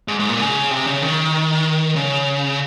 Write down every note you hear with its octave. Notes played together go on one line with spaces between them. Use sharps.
G#2
G#2
A#2
C#3
C3
C#3
D#3
C#3